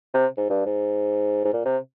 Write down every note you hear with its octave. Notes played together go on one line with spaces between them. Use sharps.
C3
G#2
G2
G#2
G#2
A#2
C3